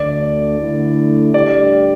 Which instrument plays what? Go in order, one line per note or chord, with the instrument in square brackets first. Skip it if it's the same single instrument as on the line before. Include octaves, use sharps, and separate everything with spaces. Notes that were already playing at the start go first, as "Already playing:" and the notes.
Already playing: [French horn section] D2 D3 A3 [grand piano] D5
[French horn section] D3 A3 E4
[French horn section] A2 G3 D4 G4 [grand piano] D5